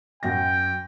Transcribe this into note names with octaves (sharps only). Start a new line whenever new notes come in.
F#2 F#5 G5 A#6